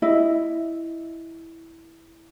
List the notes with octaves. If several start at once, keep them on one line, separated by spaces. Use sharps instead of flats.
E4 D#5